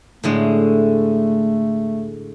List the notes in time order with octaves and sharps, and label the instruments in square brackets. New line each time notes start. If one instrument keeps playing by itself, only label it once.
[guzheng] A2 D3 G#3 [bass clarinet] A3